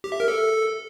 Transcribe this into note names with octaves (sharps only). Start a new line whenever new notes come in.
G4
E5
A#4
A4